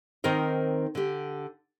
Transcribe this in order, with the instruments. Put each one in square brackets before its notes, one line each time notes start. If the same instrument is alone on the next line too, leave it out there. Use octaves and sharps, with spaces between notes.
[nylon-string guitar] D#3 C4 D#4 A#4 C5
D3 G4